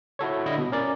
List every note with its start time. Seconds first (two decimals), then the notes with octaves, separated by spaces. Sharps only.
0.19 E4 F#4 A4 C#5
0.46 D3 G3 E4 D#5
0.58 B2
0.72 C#4 A#4 D5